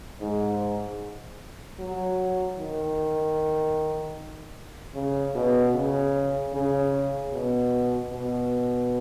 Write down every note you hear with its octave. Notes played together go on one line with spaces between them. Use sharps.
G#2
F#3
D#3
C#3
B2
C#3
C#3
B2
B2